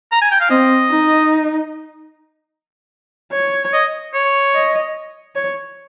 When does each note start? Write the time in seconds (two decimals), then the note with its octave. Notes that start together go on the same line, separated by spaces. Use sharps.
0.12 A#5
0.21 G#5
0.31 G5
0.40 F5
0.50 C4 D#5
0.90 D#4
3.33 C#5
3.73 D#5
4.14 C#5
4.54 D#5
5.36 C#5